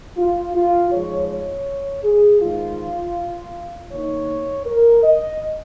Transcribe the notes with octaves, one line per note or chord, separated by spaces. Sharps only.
F4
F4
G#2 F3 G#3 C#5
C#5
G#4
G#2 D#3 G#3 F4
D#3 A#3 D#4 C#5
A#4
D#5